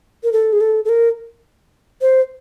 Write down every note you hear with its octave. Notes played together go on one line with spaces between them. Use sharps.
A#4
A4
G#4
A4
A4
A#4
C5